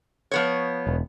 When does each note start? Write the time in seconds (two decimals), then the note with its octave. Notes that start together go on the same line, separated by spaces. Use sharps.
0.31 F3 B3 C#5
0.87 E1